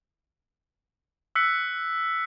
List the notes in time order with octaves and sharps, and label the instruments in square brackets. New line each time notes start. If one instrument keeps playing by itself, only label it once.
[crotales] E6 F#6 B6 C#7